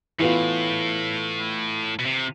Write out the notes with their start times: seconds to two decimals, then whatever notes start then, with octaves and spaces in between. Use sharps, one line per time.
0.19 A2 E3 B3 F4
1.99 B2
2.06 C3